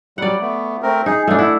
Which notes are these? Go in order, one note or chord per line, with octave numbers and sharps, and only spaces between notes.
F#3 G3 D5 F#5
A3 B3
A3 C4 A#4
D#4 G#4
A3 B3 C#4 D4
E4 F#5